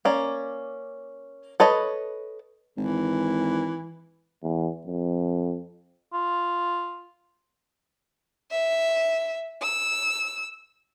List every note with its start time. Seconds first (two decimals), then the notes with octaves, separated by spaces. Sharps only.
0.05 A#3 C#4 D5
1.60 A4 B4 C#5 D#5
2.77 G#1 E3
4.43 E2
4.86 F2
6.13 F4
8.51 E5
9.62 E6